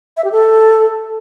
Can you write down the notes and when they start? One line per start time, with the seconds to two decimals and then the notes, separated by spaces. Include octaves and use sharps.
0.17 E5
0.24 G4
0.32 A4